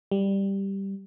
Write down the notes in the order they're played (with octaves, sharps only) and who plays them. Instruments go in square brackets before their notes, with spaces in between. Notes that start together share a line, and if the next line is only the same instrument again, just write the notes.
[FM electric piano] G3